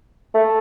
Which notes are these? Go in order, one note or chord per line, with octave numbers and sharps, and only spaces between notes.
A3